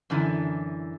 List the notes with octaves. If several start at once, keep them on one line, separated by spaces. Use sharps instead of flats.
F#2 D3 E3